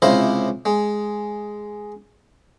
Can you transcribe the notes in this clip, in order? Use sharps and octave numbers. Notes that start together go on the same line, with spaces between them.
C#2 C3 E4 C5 D#5 F5
G#3